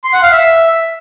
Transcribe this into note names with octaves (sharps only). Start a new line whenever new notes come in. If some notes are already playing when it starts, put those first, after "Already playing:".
C6
F#5
F5
E5